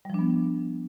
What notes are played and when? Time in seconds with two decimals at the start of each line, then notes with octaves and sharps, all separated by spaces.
0.05 G3
0.10 F3
0.14 D4
0.19 B3